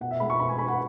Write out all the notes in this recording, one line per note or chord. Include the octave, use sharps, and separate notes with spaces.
B2 F#5
E5
G#3 B5
C#6
B2 B5
G#5
G#3 B5
F#5